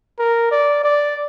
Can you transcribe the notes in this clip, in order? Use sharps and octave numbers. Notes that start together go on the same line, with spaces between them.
A#4
D5
D5